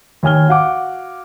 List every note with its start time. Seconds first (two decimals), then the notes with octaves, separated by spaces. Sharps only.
0.23 D#2 C#5 G#5 F6 G7
0.48 F#4 F5 F#5 D6